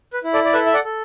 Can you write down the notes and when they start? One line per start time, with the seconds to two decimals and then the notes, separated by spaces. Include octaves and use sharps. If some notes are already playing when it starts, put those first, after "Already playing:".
0.13 B4
0.24 E4
0.34 A4 D5
0.45 D5
0.53 A4 B4 E5
0.66 E5
0.74 D5 F#5
0.84 A4